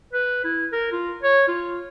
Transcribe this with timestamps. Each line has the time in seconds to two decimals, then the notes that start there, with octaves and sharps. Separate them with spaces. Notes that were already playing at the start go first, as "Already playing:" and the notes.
0.13 B4
0.44 E4
0.72 A#4
0.92 F4
1.23 C#5
1.48 F4